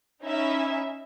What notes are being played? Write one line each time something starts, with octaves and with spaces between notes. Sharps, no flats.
C#4 D#4 E4 E5